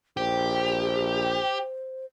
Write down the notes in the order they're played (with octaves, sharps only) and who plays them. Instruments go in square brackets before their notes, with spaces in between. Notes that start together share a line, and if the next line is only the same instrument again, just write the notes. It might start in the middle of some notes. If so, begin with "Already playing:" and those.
[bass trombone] A#1 [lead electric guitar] G4 [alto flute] C5